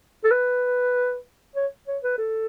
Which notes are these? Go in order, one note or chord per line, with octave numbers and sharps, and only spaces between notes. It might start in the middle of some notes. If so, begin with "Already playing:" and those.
A4
B4
C#5
C#5
B4
A4